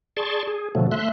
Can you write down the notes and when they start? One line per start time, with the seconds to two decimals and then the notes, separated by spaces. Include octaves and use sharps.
0.17 G#4 D5 A5 C6 C#6
0.47 G#4
0.75 B2 D3 F3 F#3 A3
0.91 A3 E5 C6 F#6